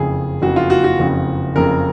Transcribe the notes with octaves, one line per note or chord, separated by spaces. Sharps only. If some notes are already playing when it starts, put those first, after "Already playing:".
Already playing: F#1 F2 C#3 G#4
F#1 F2 C#3 F#4
F4
F#4
F#4
F#1 F2 C#3
F#1 F2 C#3 A#4